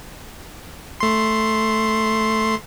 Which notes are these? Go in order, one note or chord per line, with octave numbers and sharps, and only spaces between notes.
A3 C6